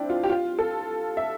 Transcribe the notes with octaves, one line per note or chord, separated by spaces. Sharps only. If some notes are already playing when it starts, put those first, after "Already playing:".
Already playing: C4 D4 E4
F4
G4
F4
A4
E5